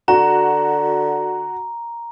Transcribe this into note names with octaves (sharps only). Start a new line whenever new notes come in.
D3 F#4 A#5